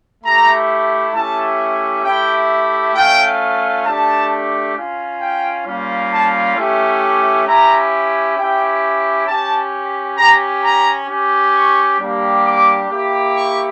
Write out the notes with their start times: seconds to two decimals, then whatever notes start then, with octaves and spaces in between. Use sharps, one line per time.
0.24 A3 E4 G4 A#5
1.14 A3 C#4 E4 G4 A5
2.04 A3 E4 G4 G5
2.95 A3 C#4 F4 G5
3.86 A3 D4 G4 A5
4.76 C#4 F4
5.21 G5
5.66 G3 A#3 C#4 F4
6.11 A5
6.56 A3 C#4 E4 G4
7.46 C#4 E4 G4 A#5
8.37 C#4 E4 G4 G5
9.27 C#4 G4 A5
10.18 C#4 G4 A#5
10.63 A#5
11.08 C#4 G4
11.54 C#6
11.99 G3 A#3 D4 G4
12.44 D6
12.89 A#3 E4 G4
13.34 C#6